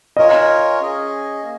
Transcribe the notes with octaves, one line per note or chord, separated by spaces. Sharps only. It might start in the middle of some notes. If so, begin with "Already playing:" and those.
F4 A#4 C#5 D#5 G#5
C#4 G#4 D#5 G#5
A#3